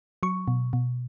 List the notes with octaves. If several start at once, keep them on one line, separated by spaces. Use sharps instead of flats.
F#3 C#6
B2
B2